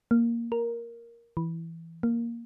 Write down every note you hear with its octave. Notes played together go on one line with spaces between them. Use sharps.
A#3
A#4
E3
A#3